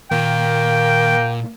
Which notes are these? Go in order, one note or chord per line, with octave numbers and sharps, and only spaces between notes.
A#2 D#3 A#3 G5